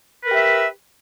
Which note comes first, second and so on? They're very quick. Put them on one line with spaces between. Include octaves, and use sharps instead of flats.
B4 A#4 G4 E5